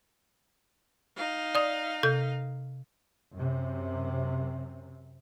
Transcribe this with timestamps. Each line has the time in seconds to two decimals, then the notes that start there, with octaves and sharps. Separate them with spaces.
1.16 D#4 F5
1.55 D5 D#6
2.03 C3 A4 G6
3.35 F#2 C3